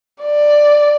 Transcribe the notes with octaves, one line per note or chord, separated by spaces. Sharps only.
D5